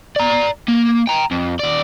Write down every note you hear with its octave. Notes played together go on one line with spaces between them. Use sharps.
D5 A#5
A#3
G5 A#5
F2
D#2 D5